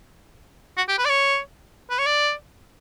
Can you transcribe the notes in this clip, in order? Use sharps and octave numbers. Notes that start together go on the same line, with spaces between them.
F#4
G4
B4
D5
C#5
B4
C#5
D5